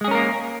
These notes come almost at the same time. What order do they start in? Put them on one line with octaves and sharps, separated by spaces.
G#3 G#4 C#4 A#4 A#3